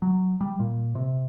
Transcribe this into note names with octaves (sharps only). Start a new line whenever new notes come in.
F#3
G3
A#2
C3